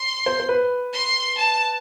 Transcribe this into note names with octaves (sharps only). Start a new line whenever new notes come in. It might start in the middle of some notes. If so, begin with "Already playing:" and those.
Already playing: C6
C5
C5
B4
C6
A5